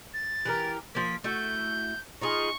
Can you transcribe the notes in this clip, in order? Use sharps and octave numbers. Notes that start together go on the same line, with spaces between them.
A6
E3 G4 A#4
F3 A#3 B6
A3 E4 F#4 G6
D#4 F4 G#4 C#6